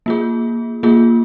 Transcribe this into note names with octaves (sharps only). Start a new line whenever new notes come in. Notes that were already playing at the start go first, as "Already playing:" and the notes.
A#3 F4 G#4
A#3 F4 G#4